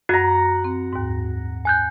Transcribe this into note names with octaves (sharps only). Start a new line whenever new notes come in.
F#2 F#4 F#5 A#5
C4
D#2 G#2
G#5 F#6 G6